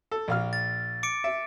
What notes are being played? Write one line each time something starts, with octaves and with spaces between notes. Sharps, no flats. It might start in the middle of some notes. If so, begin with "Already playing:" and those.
A4
A#1 F5 F6
A6
D6 C#7 D7
E5